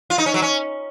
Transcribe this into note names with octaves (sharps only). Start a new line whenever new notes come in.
F4
D#4
C#4
F#3
C#4